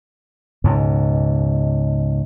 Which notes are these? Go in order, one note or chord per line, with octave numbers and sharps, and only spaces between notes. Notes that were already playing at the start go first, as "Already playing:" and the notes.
C#2 G#2 B2